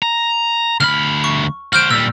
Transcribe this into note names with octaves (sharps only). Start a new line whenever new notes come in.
A#5
D2 B5 F6
C#6
F#4 C5 F6 G6 D7
A#2 G3 E6